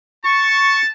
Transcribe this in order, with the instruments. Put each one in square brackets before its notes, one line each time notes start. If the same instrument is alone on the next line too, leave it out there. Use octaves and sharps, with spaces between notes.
[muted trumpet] A5 [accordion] C#6